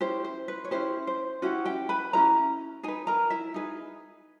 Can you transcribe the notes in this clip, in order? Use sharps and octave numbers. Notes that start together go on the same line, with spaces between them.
C#4 E4 G4 C5
C5
B4
C#5
C#4 E4 G4 C5
C5
C#4 E4 F#4 G4 F#5
G4 G5
B4 B5
C#4 E4 G4 A#4 A#5
D#4 G#4 B4 G#5
A#4 A#5
E4 E5
D#4 G#4 B4